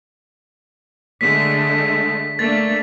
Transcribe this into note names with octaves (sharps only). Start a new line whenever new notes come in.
D3 G#3 A3 B6
A3 A#3 D4 A6